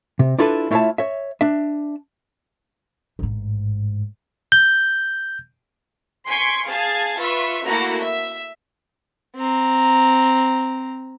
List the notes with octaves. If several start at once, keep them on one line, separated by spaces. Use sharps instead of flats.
C3
D4 E4 F4 A4 B4
A3 E4 F4 C#5 E5 A5
C#5 E5
D4 E5
A1 G#2
G6
G#5 C6 C#6 G#6 B6 D7
G#4 F5 A5 G#6 A6
F4 B4 E5 C#6
A3 A#3 E4 F#4 A#5
E5
C4 A#5